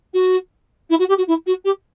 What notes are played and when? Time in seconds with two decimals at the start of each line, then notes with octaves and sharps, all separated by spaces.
0.14 F#4
0.90 E4
0.99 F#4
1.09 G4
1.18 F#4
1.28 E4
1.46 F#4
1.65 G4